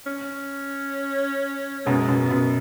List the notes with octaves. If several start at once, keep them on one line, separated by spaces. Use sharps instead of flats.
C#4
F#2 B2 G#3
F#2 B2
B3
F#2 B2